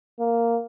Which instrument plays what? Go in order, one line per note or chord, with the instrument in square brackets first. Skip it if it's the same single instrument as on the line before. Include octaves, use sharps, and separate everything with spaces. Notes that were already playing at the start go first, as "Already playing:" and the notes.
[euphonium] A#3